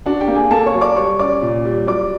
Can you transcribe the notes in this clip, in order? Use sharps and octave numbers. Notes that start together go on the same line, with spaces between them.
D4 F#4 F#5
G4 G5
A#3
G#4 G#5
A#3 A4 A5
C#5 C#6
F#3
D5 D6
G3 C#5 C#6
C#4 D5 D6
A#2
G3
F#3 D5 D6